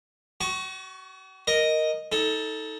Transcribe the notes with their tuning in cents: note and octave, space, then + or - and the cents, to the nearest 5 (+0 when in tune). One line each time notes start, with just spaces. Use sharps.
F#4 +40 A5 -40 C#6 +0
A#4 +0 D#5 +0
D#4 +30 A4 +0